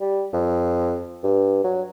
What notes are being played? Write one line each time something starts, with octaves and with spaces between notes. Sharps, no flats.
G3
F2
G2
F#3